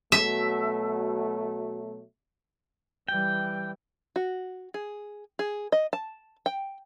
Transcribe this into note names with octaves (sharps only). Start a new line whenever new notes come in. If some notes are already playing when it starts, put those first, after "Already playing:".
B2 F#3 A3 E5
E3 G3 G5
F#4
G#4
G#4
D#5
A5
G5